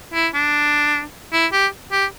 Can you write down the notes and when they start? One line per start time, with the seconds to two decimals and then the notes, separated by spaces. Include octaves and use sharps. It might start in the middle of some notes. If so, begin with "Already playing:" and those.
0.14 E4
0.34 D4
1.33 E4
1.53 G4
1.92 G4